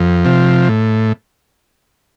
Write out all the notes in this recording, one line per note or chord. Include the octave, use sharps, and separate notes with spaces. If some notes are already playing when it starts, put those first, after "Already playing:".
Already playing: F2
C3 F3
A2